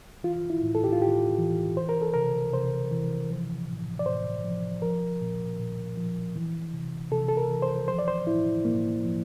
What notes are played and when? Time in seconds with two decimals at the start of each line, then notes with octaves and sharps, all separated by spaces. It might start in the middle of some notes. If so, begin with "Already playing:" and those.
0.23 E3 F4
0.50 E4
0.63 A2
0.75 A4
0.84 G4
0.92 F4
1.01 A2 G4
1.38 E3
1.77 E3 C5
1.89 A#4
2.02 A4
2.14 C3 A#4
2.53 C3 C5
2.91 E3
3.30 F3
3.68 A2
3.99 D5
4.06 A2 C5
4.45 F3
4.82 F3 A#4
5.21 A#2
5.59 A#2
5.97 F3
6.36 E3
6.73 C3
7.11 C3 A4
7.29 A4
7.37 A#4
7.51 E3
7.62 C5
7.88 F3 C5
7.99 D5
8.08 C5
8.26 A2 E4
8.65 A2 A#3
9.03 F3